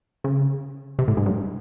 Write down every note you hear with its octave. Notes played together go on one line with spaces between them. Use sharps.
C#3
C3
A2
G#2
G2